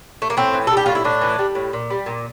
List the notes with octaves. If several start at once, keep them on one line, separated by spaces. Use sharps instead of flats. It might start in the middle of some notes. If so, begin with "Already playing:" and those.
A3
A#3
A2 C4
E3
G3 A4
G4
A2 F4
E4
A2 D4
E3
G3
A2
A#2
G3
A#2